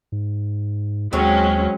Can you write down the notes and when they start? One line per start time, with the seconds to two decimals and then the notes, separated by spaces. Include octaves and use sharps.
0.12 G#2
1.13 D#2 F#3 G#3 C4 C#4 C#5